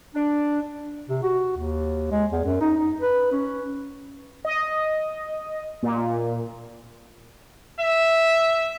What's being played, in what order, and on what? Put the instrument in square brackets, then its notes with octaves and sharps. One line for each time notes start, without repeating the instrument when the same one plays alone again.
[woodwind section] D4
[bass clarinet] C3
F#4
D#2
G#3
E2
F#2
D#4
D#4
B4
C#4
[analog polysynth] D#5
A#2
[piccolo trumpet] E5